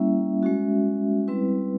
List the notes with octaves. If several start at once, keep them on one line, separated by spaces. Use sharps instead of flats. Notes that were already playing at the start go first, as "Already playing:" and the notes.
Already playing: G3 A#3 C#4 E4 E5
G#3 C#4 F#4
G3 C4 E4 B4